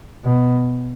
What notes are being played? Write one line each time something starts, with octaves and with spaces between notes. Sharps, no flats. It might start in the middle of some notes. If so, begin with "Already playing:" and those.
B2